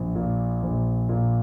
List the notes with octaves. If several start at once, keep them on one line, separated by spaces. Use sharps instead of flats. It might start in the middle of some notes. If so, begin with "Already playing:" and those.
Already playing: A#1
A#2
A#1
A#2